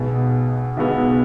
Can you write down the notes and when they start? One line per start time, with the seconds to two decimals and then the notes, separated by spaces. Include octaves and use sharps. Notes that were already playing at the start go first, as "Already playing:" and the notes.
Already playing: B1 B2 G#3 B3
0.77 B1 B2 G#3 B3